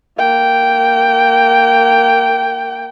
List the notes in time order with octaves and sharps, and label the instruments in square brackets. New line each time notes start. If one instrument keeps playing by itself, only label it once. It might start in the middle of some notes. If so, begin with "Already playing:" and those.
[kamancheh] A#3 G5